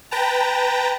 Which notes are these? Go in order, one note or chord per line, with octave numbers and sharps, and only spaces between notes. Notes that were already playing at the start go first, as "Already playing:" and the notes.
B4 G5 A5 A#5